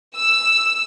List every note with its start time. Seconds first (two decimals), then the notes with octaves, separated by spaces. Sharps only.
0.15 E6